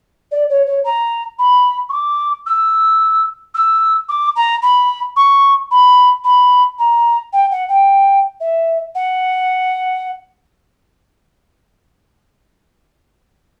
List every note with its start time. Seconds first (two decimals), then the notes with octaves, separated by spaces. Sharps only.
0.31 D5
0.49 C#5
0.67 C#5
0.84 A#5
1.38 B5
1.89 C#6
1.92 D6
2.46 E6
3.54 E6
4.09 D6
4.35 A#5
4.62 B5
5.16 C#6
5.71 B5
6.24 B5
6.78 A#5
7.33 G5
7.51 F#5
7.69 G5
8.40 E5
8.95 F#5